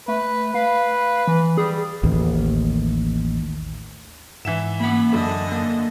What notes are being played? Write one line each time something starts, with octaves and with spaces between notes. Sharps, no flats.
A3 B4
B4 F5
E3
G3 G#4
A1 D#2
G#2 E3 E5 E7
A#3 F#5 B5
F#2 D3 A4 D#5
A#3